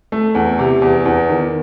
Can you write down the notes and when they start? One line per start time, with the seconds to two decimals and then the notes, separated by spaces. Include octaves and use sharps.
0.12 A3
0.35 E2
0.59 C3
0.82 E2
1.06 E2
1.29 D#3